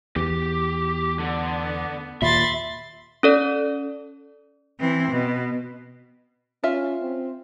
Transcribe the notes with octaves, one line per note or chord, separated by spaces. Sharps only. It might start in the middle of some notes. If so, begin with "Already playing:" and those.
E2 G4
D3 B3
D#2 A#2 E5 B5 C6 A6
C#4 A4 D5
E3 C4
B2
C#4 F4 E5
C4